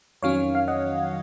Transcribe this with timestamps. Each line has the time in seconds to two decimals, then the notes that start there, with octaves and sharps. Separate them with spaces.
0.22 F2 D#3 F#3 C#4 C#5 F5
0.55 F5
0.68 D#5 F#5